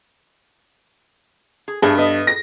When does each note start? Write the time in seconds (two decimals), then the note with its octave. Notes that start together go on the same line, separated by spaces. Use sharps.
1.68 G#4
1.82 G2 A3 B3 G#4
1.98 B3 B4 D#5
2.27 A#6